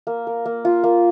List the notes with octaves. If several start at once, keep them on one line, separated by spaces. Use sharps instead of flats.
A#3
A#4
A#3
F4
A#3